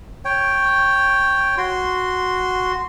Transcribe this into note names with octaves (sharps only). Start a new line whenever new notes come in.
C#5 G5
F#4 C6